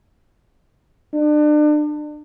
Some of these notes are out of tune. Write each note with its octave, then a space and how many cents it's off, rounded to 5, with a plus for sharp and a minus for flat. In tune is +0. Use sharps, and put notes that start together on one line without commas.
D4 +35